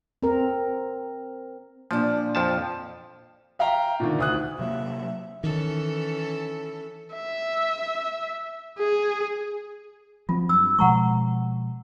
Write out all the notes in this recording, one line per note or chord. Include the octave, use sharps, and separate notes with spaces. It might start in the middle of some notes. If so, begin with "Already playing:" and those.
C4 A#4
A#2 F3 D4
F2 F3 A5
E5 F5 G5 A#5
A#2 D3 D#3
D2 D#6 F#6
C3 F#3 A#3 E5
D#3 E3 C#4 A4
E5
G#4
F3 F#3 C4 F4
G2 E6
B2 F3 G#3 F#5 A#5 C#6